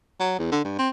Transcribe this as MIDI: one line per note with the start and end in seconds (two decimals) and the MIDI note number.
0.20 0.34 54
0.39 0.48 40
0.52 0.64 50
0.65 0.74 43
0.79 0.89 60